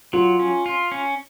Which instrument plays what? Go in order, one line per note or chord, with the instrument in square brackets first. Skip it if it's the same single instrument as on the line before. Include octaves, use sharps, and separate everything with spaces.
[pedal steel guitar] F#3 [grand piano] F4
[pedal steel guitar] C#4
F4
C#4